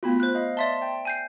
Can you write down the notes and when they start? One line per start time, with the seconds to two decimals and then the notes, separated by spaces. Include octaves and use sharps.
0.03 A3 B3 F4 F#4 B5
0.20 C5 F#6
0.35 D#5 F5
0.57 D5 E5 A5 C6 G7
0.82 G5
1.05 G#5 G6 C7